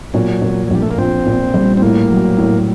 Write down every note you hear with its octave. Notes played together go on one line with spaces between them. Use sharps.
A#2 F#3
A#2
F#3
A#1 G3
A3
A#3
A#1 C4
A#2
G3
C4
A2 A#3
F#3
A2